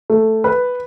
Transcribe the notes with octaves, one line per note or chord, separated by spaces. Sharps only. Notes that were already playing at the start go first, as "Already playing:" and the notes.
A3
B4